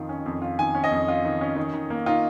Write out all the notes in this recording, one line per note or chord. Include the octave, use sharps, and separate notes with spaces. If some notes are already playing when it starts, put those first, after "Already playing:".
Already playing: F2 D#3 F4
C#4
F2
F4
D#3 G#5
C#4
D#5
F2
F4
D#3
C#4
D#3
D#3
A#3
D#4 F4